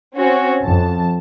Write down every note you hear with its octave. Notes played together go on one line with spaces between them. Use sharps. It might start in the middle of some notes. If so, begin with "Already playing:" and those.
C4 C#4 F#4
F2 A5